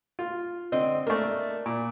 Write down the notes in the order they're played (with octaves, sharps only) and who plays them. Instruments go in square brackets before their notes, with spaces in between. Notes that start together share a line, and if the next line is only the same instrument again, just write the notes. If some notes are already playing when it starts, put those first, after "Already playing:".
[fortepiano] F4
[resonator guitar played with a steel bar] D3 D#5 [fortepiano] C4
[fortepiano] A3 A#3 [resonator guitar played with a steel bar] D4
[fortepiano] A#2